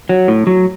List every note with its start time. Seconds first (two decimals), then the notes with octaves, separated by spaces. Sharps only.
0.09 F#3
0.28 A2
0.47 F#3